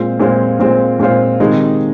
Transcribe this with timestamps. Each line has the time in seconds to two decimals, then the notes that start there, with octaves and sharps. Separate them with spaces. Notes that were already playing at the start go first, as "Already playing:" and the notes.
Already playing: A#2 G#3 C4 F4 C5
0.20 A#2 G#3 C4 F4 C5
0.60 A#2 G#3 C4 F4 C5
0.99 A#2 G#3 C4 F4 C5
1.40 C3 D#3 G#3 D#4